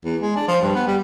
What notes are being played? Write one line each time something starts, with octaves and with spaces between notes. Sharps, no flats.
E2
G#3
D4
F3
G2
B3
G3